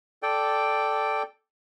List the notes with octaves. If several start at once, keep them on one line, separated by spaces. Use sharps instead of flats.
A4 D5 G5